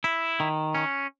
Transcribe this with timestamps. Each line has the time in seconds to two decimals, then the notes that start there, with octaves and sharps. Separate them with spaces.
0.04 E4
0.40 D#3
0.75 C#4